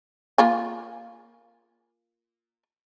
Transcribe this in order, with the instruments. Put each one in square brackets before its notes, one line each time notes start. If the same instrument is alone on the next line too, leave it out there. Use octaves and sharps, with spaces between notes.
[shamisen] A#3 F4 G#5